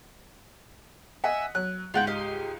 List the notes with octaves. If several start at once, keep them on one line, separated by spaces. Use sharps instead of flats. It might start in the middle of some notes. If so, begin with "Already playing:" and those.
D#5 E5 F#5 G#5
F#3 F#6
C#2 G#2 F4 F#5 G5
G4 D#5 F5